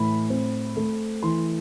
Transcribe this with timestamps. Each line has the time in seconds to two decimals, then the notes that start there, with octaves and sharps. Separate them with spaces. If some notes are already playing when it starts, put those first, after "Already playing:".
Already playing: A2 E3 B5
0.30 C4
0.76 A3
1.23 E3 C6